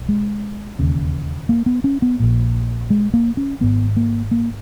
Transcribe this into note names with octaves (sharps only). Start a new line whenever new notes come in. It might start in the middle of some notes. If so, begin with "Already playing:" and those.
Already playing: B1
G#3
E1 D#2 C#3
A#3
B3
C#4
B3
A#1 A#2
G#3
A#3
C#4
G#1 G#2 B3
A#3
A#3